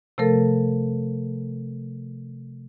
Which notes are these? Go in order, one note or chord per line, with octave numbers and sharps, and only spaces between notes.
C3 F3 A3 A4 A#4